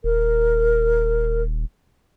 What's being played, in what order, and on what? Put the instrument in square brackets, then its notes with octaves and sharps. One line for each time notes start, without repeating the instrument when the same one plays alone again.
[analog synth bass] D#1 [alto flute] A#4